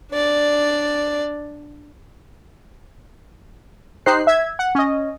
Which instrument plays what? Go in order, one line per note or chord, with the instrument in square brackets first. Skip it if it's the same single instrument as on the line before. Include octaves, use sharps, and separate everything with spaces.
[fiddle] D4 D5
[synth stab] D#4 G4 C5 F#6 C7
E5 G#6
F#5
C#4 D#5